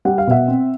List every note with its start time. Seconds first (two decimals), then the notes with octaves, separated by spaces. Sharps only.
0.05 G3 F#5
0.18 F5
0.27 B2 E5 F#5
0.48 C4